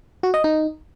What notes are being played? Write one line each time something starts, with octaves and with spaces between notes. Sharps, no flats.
F#4
D#5
D#4